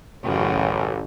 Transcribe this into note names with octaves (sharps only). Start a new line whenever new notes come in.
A1 F#2 C#3 F#4